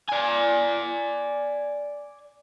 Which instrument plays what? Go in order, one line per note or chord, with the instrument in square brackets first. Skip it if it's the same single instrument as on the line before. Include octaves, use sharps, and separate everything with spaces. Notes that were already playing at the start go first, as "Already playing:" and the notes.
[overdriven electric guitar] D5 G#5